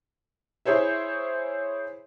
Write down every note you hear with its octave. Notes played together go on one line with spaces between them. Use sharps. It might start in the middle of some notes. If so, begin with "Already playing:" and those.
E4 G#4 C5 C#5 E5